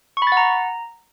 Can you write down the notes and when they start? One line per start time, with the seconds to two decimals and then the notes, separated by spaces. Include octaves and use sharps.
0.17 C#6
0.22 B5
0.27 A6
0.32 F#5
0.37 A#5